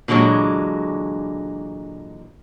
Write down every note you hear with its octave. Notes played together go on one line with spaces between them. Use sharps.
A#2 D3 E3 F#3 G#3